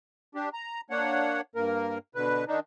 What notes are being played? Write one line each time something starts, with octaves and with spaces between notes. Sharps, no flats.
D4 G4
A#5
A#3 D4 C#5 F#5
G2 A#3 A#4
B2 D3 B4
D#3 D4 D#4